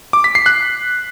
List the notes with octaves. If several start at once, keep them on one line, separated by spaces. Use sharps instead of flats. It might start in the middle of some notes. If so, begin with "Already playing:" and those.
D6
B6
C7
F#6